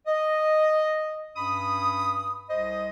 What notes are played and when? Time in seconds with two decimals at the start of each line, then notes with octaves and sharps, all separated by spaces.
0.07 D#5
1.35 G2 C#4 B5 D#6
2.49 C2 C5 D#5